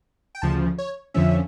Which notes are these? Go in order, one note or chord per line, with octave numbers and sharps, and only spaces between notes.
G5
D2 C#3 F3 A5
C#5
F2 D3 F3 C#4 E5